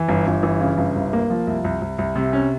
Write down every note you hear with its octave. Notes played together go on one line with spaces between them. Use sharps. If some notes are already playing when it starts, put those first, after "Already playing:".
Already playing: E3
G1
G1
E3
C#3
G1
C2
A#3
F3
C2
C2
C2
C2
C3
C#4